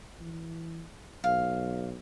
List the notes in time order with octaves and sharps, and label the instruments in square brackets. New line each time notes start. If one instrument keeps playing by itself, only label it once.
[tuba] E3
[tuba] B1 [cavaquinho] F5